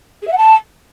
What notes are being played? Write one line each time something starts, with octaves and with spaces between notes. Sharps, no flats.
G#4
E5
F#5
A5